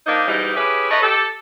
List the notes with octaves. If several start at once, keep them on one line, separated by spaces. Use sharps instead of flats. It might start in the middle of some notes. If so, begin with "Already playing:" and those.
F3 A#3 D4 D#4
G#2 B2 E3 G3 D#4
C#4 E4 G4 G#4 B4
A4 B4 C#5 D#5
G4 A4